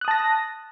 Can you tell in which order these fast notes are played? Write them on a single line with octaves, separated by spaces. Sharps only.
F#6 D#6 A5 A#6